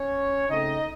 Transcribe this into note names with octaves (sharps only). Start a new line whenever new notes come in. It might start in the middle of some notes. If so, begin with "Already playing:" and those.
Already playing: C#4 C#5
C#3 A3 C4 D#4 D#5